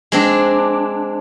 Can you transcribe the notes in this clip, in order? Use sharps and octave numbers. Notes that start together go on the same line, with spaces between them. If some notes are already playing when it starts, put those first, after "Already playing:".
G#3 C4 D4